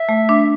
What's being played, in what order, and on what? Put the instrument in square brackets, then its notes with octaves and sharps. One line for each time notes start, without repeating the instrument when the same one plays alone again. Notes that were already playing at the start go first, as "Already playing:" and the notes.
Already playing: [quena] E5
[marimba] A3
D4